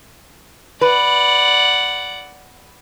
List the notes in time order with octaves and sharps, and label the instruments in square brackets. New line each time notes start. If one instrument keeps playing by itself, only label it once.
[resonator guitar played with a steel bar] B4 [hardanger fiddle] D5 F#5